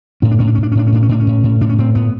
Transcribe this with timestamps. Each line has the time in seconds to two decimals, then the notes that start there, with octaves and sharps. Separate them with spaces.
0.22 A2 C#4
0.31 D4
0.39 A2 C#4
0.47 D4
0.55 C#4
0.58 A2
0.63 D4
0.72 C#4
0.75 A2 D4
0.87 C#4
0.92 A2 D4
1.03 C#4
1.09 A2 D4
1.20 C#4
1.27 A2
1.43 A2
1.61 A2 D4
1.69 C#4
1.78 A2 C4
1.95 A2 B3